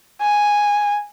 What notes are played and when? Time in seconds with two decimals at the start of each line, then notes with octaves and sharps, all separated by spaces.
0.22 G#5